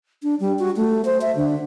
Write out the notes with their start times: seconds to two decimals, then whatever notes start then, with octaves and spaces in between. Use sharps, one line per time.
0.23 D4
0.40 G3
0.59 F#4
0.77 A3
1.05 C5
1.21 E5
1.36 D3